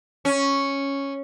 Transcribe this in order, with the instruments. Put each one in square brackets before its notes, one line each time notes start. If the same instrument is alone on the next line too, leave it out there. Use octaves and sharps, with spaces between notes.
[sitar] C#4